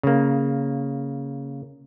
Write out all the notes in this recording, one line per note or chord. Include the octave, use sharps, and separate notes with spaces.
C#3 A#3